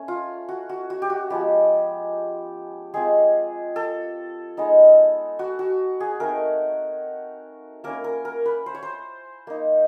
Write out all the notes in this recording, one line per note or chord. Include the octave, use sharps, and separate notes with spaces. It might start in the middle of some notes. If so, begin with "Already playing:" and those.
Already playing: A3 C#4
F4
F#4
F#4
F#4
G4
F#4
F3 G#3 B3 G4
G#3 C4 F4 G#4
A4
G#3 B3 D#4
F#4
F#4
G#4
A3 C4 D#4 A#4
A#3 C#4 E4 A#4
A#4
A#4
B4
C5
C#5
C5
A#3 D#4